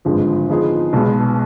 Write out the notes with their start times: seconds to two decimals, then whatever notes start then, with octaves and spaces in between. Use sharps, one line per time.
0.05 G#1 G2 D3 F3 G#3
0.49 G#2 F3 B3 D#4 G#4
0.93 B1 B2 G#3 B3